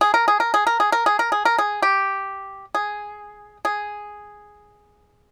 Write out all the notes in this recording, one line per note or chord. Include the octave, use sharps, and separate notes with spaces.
G#4
A#4
G#4
A#4
G#4
A#4
G#4
A#4
G#4
A#4
G#4
A#4
G#4
G4
G#4
G#4